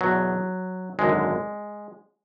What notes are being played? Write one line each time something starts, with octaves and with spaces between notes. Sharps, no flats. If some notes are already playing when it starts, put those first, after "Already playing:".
E2 B2 F#3
G#1 F#2 D3 G#3